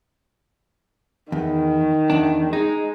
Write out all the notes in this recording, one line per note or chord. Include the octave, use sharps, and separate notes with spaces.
E2 D#3
E2 D4
G#3 D#4